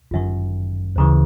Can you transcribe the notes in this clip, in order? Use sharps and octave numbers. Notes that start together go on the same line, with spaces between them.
G1 F#2 D#3
D2 C#3 E3